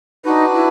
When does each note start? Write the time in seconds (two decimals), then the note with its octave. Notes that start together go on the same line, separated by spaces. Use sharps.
0.25 D4 D#4 F#4 B4
0.54 E4